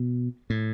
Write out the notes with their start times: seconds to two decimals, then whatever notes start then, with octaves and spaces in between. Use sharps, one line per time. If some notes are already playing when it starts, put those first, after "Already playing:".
Already playing: B2
0.50 A2